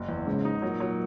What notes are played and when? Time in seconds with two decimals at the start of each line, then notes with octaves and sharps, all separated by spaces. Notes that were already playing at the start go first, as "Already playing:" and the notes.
Already playing: F#1
0.09 E2
0.26 G#2 C#3
0.45 D#4
0.62 A#2 F#3
0.80 F#3